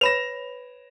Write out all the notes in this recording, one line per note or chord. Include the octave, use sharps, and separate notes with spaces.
B4 C#5 B5 A#6 E7 F7